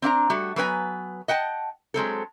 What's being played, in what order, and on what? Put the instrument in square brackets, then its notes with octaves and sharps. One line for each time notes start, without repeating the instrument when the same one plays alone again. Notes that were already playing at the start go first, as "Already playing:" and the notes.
[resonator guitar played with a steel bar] C4 D4 F5 A#5
G3 A3 F#4
F#3 B3 B4 G#5 A#5
D#5 F#5 G5 A5
F#3 G#3 C4 A4